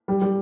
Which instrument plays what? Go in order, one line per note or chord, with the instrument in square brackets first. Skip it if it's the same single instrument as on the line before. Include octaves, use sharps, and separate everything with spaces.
[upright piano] G3
G3